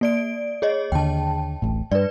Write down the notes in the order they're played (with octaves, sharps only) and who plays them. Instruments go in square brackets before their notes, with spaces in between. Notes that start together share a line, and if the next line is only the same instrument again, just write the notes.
[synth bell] A#3 D5 D7
G#4 C#5 D#5
[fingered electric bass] D#2 D3 [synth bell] G5 A5
[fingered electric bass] D1 A1 A2
[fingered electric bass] G2 [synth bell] B4 D5